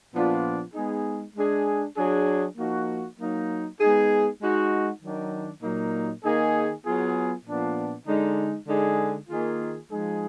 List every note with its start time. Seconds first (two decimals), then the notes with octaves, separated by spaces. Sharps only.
0.13 A#2 F3 B3 D4 F4
0.74 G#3 B3 D#4 G#4
1.35 G#3 D4 G#4
1.96 F#3 D4 G#4
2.57 F3 A#3 D#4 F#4
3.18 F#3 A#3 D#4
3.79 G#3 B3 D#4 G#4
4.40 G#3 D#4 F#4
5.01 D#3 F#3 D4
5.62 A#2 F#3 A#3 D#4
6.24 D#3 A#3 D#4 G#4
6.85 F#3 B3 F4 G#4
7.45 A#2 F3 B3 D4
8.07 D3 G#3 D#4
8.68 D3 G#3 D#4 G#4
9.29 D#3 A#3 F4 G#4
9.90 F3 G#3 D#4 G#4